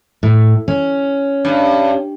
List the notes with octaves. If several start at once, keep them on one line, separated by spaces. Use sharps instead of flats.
A2
C#4
G2